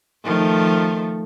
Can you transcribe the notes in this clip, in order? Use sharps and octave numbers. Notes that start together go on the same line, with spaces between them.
D#3 F3 A3